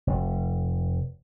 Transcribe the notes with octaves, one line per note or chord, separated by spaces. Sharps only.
F1